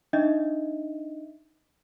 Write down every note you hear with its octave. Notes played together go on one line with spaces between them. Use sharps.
D4 D#4 D#5 E5